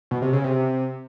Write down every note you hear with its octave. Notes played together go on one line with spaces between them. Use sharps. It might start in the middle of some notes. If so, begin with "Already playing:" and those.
B2
C3
C#3
C3